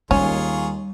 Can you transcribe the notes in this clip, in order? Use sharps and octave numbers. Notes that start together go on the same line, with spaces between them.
D#2 G3 C#4 F4 G#4 C#5